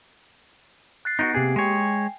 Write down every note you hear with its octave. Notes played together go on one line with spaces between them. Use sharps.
F#6 A6 C7
B3 D#4 F4 F#4 D7
C3 A#3 G4 G#4
G#3 C#5 G5 G#5 C7